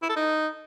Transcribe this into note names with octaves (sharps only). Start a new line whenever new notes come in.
E4
A4
D#4